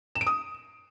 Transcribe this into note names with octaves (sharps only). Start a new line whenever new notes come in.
E7
D7
D#6